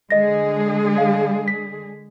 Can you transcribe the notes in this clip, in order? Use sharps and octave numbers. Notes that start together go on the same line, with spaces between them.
D3 G#3 G#4 D#5 A#6
F5
B6